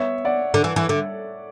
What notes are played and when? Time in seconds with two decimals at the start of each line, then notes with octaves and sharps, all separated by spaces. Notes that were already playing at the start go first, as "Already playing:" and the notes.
Already playing: B3 C#5 E5
0.25 D5 F#5
0.54 D3
0.64 E3
0.76 E3
0.89 D3